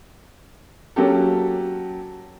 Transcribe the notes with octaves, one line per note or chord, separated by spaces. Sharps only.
F#3 A#3 C#4 G4 A4